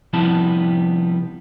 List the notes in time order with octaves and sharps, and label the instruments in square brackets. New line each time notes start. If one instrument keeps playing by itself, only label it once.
[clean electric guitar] C3 F3 G3 B3 E4 A5